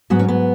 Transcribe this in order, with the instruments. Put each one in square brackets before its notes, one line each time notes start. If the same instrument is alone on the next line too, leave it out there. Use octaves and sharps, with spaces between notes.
[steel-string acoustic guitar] G#2 F#3 B3
C#4
B3